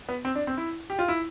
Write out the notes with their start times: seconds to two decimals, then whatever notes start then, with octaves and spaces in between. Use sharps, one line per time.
0.09 B3
0.25 C4
0.35 D4
0.47 C4
0.57 E4
0.90 G4
0.99 F4
1.08 E4